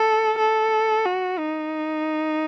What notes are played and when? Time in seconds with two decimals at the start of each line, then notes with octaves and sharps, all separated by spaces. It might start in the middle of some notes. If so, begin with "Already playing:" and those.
Already playing: A4
0.39 A4
1.06 F#4
1.39 D#4